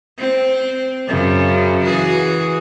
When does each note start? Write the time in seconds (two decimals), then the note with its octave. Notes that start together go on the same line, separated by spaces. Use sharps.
0.19 C4
1.08 F#2 C#3
1.84 E3 F#4 G#4